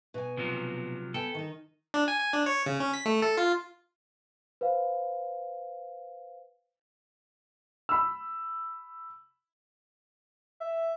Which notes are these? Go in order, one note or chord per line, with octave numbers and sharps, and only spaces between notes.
B2 G#5
C3 F3 F#3
B3 A4 G5 G#5
D#3 D#4
D4
G#5
G#5
D4
C#5
C#3
C#4
B6
A3
A4
F4
B4 C5 F5
B5 E6
E5